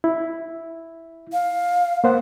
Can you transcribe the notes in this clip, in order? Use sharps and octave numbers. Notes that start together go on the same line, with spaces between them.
E4
F5
A#3 C5 F#5